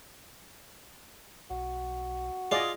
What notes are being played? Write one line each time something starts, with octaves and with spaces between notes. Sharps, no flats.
B1 F#4
F4 G#4 D5 D#5